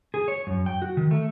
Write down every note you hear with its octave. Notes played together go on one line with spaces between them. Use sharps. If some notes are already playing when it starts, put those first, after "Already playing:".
G#4
C#5
F#2
G5
F#4
D#3
A3